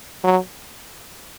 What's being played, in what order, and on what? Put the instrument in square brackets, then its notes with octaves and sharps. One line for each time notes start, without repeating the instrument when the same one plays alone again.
[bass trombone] F#3